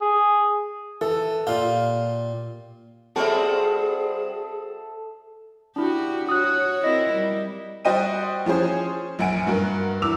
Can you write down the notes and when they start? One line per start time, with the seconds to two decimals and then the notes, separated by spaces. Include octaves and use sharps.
0.01 G#4
1.01 E3 A4
1.47 A#2 F4 G4 F5
3.16 G3 C4 F#4 G#4 A4 E5
5.76 D4 E4 F#4 G4
6.29 F#4 C#5 D#6 F#6
6.84 C4 E4 A#4 D#5
7.14 G3
7.85 G3 F#4 C5 D#5 G5 D#7
8.45 E3 F3 C#4 G#4 C5
9.19 A#1 F#2 F#5 G#5 D7
9.47 G2 F#4 A#4
10.02 E2 D6 E6 F7